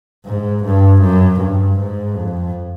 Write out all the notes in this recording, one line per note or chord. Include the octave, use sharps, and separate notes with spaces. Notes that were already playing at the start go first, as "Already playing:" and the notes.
G#2
G2
F#2
G2
G#2
F2